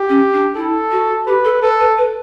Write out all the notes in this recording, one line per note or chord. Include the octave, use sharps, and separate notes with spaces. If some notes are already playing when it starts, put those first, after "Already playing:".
Already playing: G4
C#4
D4
E4 A4
F#4
G4 B4
A4
A4 B4
B4
B4